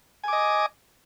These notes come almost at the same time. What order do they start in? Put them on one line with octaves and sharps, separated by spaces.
G#5 D6 D#5